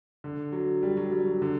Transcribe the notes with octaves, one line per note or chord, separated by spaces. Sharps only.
D3
F#3
G3
F#3
G3
F#3
D3